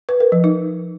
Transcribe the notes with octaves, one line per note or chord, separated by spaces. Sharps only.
B4
A#4
F3
D#4